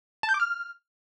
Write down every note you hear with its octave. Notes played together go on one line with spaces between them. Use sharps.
A5
G6
D6
F6